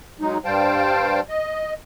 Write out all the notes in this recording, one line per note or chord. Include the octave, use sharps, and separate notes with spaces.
F#3 G#3 D#4
G2 G3 C5 F5 G5 A5
D#5